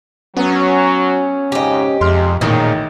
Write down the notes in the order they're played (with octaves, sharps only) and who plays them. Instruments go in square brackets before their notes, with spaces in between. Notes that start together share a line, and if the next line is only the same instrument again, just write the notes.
[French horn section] F#3 [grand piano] B3 [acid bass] C#4
[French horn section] F2 G#2 C#3 [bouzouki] G4 D#5
[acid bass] F2 [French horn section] C3 F3 G#3 [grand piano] C6 F6
[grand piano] A1 D#3 [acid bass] A#2 [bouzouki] C#4 [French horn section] D#4 G#4 D#5